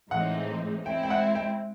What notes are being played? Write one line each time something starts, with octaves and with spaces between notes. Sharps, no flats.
A2 E3 G#3 C4 D#4 F#5
G#3 C4 E4 G5
G5
F#5
G5